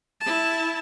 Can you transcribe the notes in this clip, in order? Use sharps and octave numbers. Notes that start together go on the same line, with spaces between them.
E4 A5